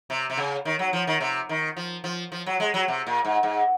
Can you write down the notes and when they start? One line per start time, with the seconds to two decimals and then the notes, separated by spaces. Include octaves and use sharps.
0.10 C3
0.30 C3
0.37 C#3
0.65 D#3
0.79 F#3
0.93 F3
1.07 D#3
1.21 C3
1.49 D#3
1.77 F3
2.04 F3
2.32 F3
2.46 F#3
2.60 G#3
2.74 F#3
2.88 C3
3.07 A#2
3.25 G#2
3.43 G#2